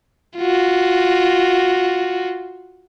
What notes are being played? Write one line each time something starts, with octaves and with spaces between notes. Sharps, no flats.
F4 F#4